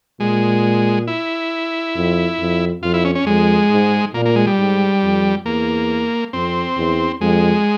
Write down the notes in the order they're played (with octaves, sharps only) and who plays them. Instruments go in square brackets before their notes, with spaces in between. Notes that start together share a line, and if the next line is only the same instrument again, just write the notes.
[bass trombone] A#2 [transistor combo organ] G#3
[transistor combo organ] E4
[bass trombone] F2
F2
[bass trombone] F2 [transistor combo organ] F4
[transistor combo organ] E4
C#4
C#4
[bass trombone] F2 [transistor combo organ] G#3
[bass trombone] G#2
[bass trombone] A#2 [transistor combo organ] A#3
[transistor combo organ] A#3
G#3
G3
[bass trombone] G#2
F2
[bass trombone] E2 [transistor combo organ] A#3
[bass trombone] F2 [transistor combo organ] C4
[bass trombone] E2
[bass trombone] F2 [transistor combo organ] G#3